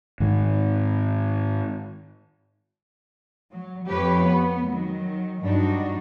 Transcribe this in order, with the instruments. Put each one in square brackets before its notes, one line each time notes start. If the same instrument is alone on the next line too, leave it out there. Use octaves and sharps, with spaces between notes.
[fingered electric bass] G#2 D#3
[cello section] F#3
F2 G4 B4 C#5
B3
D#3 F#3
G2 F#3 G#3 D4 D#4 F#4